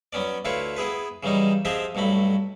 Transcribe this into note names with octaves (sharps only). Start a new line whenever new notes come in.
F#3 B3 C#4 D5
D2 A3 E4 F4 B4 C#5
B3 E4 G#4 B4
C#3 E3 F#3 G3 D#4
F3 C4 G4 G#4 D#5 E5
B1 G2 F#3 A3 B5